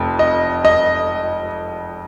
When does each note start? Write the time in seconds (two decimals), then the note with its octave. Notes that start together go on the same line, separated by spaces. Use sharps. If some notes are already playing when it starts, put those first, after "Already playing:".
Already playing: F1 F2
0.19 D#5
0.65 D#5